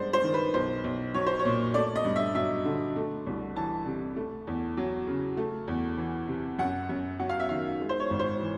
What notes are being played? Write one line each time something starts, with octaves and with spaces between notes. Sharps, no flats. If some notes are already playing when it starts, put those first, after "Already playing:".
Already playing: G2 G#3 B3 C5 D5
C5
D#3
B4
B1 C5
B1
F#3 C#5
C5
C#5
A#2
A3 D5
D#5
G2
E5
F#3 E5
D3
A3
C2
E3 A5
C3
A3
E2
F#3
C#3
A3
E2
E3
C3
F#2 F#5
F#2
F#3 F#5
F5
E5
D#3 F5
G#3
C5
C#5
G#1
C5
E3